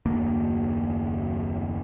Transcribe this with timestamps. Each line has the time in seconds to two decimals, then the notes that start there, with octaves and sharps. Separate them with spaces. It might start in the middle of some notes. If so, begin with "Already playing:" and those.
0.06 F#1 D#2 A#3 D4